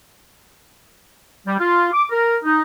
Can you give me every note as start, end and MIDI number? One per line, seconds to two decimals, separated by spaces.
1.46 1.54 55
1.58 1.88 65
1.92 2.05 86
2.09 2.36 70
2.43 2.61 63